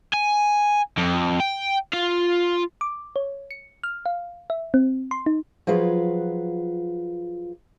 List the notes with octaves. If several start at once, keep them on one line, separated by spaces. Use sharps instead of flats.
G#5
F2
G5
F4
D6
C#5
C#7
F6
F5
E5
C4
C6
D#4
F3 F#3 F4 G#4 B4